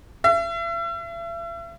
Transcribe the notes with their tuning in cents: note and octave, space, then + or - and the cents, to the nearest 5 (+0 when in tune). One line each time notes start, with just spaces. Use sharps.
E5 +40